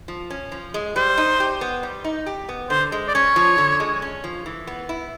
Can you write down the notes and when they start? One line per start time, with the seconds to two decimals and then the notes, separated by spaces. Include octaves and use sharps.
0.08 F3
0.30 C#4
0.52 F3
0.74 G#3
0.96 G3 C5
1.18 D#4
1.40 G4
1.61 B3
1.83 G3
2.04 D#4
2.26 G4
2.49 B3
2.70 D3 C5
2.92 G#3
3.08 D5
3.14 C#4 C#5
3.36 F3
3.58 D3
3.80 G#3
4.02 C#4
4.24 F3
4.46 E3
4.67 B3
4.89 E4